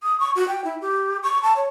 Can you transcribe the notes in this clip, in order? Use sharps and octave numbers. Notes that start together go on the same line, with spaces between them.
D#6
C#6
F#4
G5
E4
G4
C#6
A5
C#5